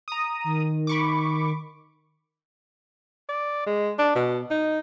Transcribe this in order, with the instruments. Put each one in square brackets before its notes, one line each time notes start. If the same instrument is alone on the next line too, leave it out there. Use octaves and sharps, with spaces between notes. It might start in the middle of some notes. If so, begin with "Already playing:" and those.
[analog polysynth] A#5 D#6
[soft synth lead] D#3
[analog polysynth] B5 C#6 D6
[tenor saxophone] D5
G#3
D4
B2
D#4